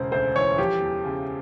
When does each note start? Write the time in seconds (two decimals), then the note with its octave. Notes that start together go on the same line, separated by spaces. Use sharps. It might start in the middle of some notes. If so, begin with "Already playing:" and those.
Already playing: E1 C#3 C5
0.12 D2 C5
0.35 E3 C#5
0.58 F3 G4
0.81 E2
1.05 C#3